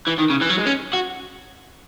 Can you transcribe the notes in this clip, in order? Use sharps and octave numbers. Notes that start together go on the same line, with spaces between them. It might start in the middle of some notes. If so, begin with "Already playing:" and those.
E3
D#3
C#3
E3
F#3
G#3
C#4
F#4